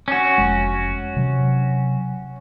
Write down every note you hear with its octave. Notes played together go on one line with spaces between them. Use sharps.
C#4 F#4
F1 G#3
C3 F#3